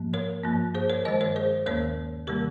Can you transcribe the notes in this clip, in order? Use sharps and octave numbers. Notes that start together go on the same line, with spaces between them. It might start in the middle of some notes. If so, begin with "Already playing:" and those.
Already playing: G#2 F3 A#3
A#4 C#5
G2 F3 A#3
G#4 C5
A#4 C#5
G2 D#3 G#3 C5 D#5
A#4 C#5
G#4 C5
D#2 D#3 A#3 A#4 C#5
C3 D#3 G3 A#3 G4 A#4